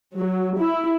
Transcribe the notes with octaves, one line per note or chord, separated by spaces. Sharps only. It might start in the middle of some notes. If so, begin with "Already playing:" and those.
F#3
E4